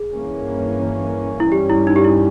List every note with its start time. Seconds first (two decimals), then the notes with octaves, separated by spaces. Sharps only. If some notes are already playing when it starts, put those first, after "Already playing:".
Already playing: G#4
0.12 G2 E3 A#3 C#4
1.40 E4
1.52 G2 G3 C#4 G4
1.70 E4
1.87 D#4
1.96 G4
2.04 E4